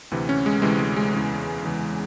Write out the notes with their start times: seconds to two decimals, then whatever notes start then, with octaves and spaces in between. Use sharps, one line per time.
0.11 D2 C3 E3
0.29 C#4
0.46 G#3
0.62 D2 C3 E3 G#3
0.79 G#3
0.96 G#3
1.14 E2 C#3 E3
1.64 E2 C#3 E3